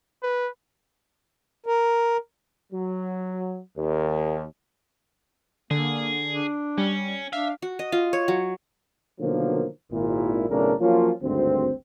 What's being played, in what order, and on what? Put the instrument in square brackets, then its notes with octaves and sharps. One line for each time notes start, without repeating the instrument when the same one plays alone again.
[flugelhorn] B4
[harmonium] A#4
[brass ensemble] F#3
D#2
[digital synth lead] D3 [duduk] A#3 [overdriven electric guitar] G#4
[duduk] D4
[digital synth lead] G3 [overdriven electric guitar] C#4
[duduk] D4 [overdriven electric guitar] E5 [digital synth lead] F5
[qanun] F#4
D#5
F4
C#5
F#3
[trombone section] B2 D3 D#3 F3 F#3 A#3
G#1 A#2 E4
B1 A2 C#3 D4 A#4
F3 F#3 A#3 C#4 F4
G#1 D2 G2 C4